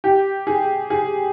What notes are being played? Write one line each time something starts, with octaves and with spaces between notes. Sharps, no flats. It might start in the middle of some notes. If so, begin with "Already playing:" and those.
G4
G#4
G#4